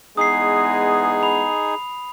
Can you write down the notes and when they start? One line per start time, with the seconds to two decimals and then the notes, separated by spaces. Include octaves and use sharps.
0.17 E2 G#3 B3 D#4 G#4 D#6 C7
1.23 B5 F7